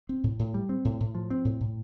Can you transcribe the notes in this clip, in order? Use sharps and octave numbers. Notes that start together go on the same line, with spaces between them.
C4
A2
A2
G3
C4
A2
A2
F3
C4
A2
A2